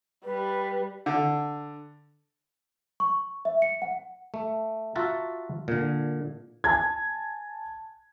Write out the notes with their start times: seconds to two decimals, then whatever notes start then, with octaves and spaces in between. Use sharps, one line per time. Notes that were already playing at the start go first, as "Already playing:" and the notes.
0.25 G3 B4
1.06 D3
3.00 C#6
3.45 E5
3.62 C#7
3.82 F#5
4.34 A3
4.95 F4 F#4 E5 F#5 A5 A#5
5.68 A#2 D3
6.64 G#5 A5 G#6